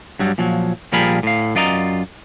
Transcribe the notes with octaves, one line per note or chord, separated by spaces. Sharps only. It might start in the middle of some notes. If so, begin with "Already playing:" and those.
G2 F#3 G3
A#2 F3 F#3
A#2 F3 G3 G#4 A#4 B5
A2 F5
F#2 F4 D5 D#5 A#5